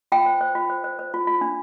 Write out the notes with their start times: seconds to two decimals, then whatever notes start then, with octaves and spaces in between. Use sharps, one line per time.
0.12 F4 G5
0.26 C5
0.41 C5
0.55 F4
0.69 C5
0.84 C5
0.99 C5
1.14 F4
1.27 F4
1.41 D4